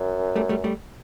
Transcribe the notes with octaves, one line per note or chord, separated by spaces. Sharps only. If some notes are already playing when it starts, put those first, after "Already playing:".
Already playing: F#2
G3 A3
G3 A3
G3 A3